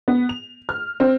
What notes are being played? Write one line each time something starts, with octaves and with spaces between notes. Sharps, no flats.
B3
F7
F6
C4